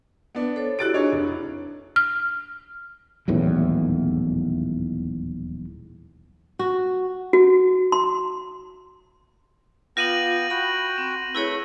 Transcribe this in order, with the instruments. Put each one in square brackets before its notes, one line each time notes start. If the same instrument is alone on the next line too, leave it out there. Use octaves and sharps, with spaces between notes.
[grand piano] B3 D4
[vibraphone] A4 C5 C#5
[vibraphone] E4 F#4 G4 [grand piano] F#6 A6 D7
[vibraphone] D4 [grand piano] D#4 G#4 C#5
[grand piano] F1
[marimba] F6
[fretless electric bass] D#1 B1 E2 A2
[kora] F#4
[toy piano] F#4
C6
[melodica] B3 G5 [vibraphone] F4 F5 D6 [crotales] A#6 D#7 F#7
[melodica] F#4 G5 [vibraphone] B5
[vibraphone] C4
[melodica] A3 B4 [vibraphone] E4 G#4 C#5